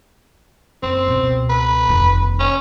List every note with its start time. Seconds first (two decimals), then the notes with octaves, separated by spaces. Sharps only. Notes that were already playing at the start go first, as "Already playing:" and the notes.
0.83 F#1 C4
1.08 C#2 B2
1.50 B4
1.89 F1 D#2
2.40 C#4